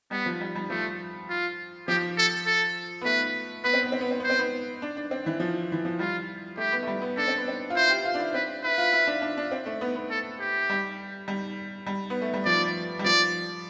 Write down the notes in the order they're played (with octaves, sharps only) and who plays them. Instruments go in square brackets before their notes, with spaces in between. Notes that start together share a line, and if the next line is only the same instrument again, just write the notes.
[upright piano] G3 [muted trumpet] B3
[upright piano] F3
G3
G3
[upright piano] F3 [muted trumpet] A3
[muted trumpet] F4
[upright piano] F3 [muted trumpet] G4
[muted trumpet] A4
A4
[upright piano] B3
[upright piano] A3 [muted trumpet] B4
[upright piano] B3 [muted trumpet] B4
[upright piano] C4
B3
C4
B3
C4
[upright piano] B3 [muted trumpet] C5
[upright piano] C4
B3
D4
D4
C4
E3
F3
E3
F3
[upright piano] G3 [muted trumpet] F4
[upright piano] A3 [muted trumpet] G4
[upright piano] B3
A3
G3
B3
[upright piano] D4 [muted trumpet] A4
[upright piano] C4
B3
C4
F4
[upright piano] E4 [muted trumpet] C5
[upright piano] G4
F4
D4
E4
[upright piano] C4 [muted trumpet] B4
[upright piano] E4 [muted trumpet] B4
[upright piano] F4
E4
D4
D4
D4
C4
A3
B3
B3
[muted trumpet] A4
G4
[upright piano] G3
G3
G3
B3
A3
G3
[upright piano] F3 [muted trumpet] D5
[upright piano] G3
[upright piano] F3 [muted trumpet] D5